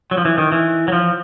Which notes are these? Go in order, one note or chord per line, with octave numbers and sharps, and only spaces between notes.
F#3
F3
E3
D#3
E3
F#3
F3